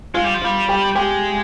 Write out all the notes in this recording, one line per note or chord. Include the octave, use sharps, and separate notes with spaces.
G#3 F4
G3
F3
G3 F4
G4
G#3 G4